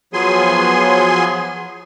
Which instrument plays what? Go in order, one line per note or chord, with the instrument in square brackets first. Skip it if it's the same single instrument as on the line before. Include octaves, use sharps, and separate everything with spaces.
[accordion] F3 F#3 B3 G#4 G#5 C6